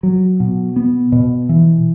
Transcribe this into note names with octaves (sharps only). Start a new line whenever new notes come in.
F#3
B2
B3
B2
E3